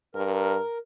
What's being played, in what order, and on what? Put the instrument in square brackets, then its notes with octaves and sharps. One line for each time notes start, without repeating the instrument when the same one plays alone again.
[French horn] G2 [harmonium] A#4